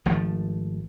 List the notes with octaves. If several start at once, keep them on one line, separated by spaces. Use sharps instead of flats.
G#1 F3 A3